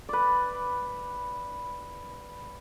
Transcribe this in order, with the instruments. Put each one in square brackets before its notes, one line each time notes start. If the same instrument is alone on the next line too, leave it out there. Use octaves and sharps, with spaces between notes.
[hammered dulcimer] B4 D5